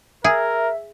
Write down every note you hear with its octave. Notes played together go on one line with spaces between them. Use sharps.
G#4 A#4 E5